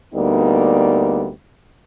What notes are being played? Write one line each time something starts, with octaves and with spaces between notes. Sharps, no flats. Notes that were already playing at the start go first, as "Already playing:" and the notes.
D2 G3 A#3 B3 D#4